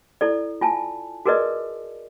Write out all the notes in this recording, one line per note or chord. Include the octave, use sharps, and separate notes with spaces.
E4 A4 D5
F4 G#5 A5
F#4 G#4 A#4 B4 D5 D#5